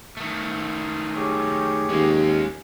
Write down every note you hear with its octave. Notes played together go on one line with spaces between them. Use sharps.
D#3 A3
G4 G#4 C#5
D#2 G#3 C#4